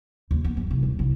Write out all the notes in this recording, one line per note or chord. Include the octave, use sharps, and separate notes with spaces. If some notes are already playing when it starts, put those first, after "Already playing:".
D#2
B3
G1
C2
D1
C2